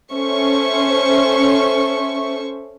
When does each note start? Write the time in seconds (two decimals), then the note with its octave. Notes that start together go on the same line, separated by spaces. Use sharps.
0.14 C#4 A4 C5 E5 C#6